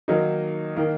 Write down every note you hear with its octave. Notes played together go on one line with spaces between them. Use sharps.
D#3 F#3 A#3 D#4
D#3 A#3